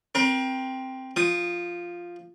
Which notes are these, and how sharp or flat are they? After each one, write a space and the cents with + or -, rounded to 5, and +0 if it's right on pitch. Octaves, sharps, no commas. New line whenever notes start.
C4 +0 A#4 +35
F3 +0 D#6 -5